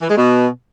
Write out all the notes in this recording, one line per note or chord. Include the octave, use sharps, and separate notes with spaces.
E3
G#3
B2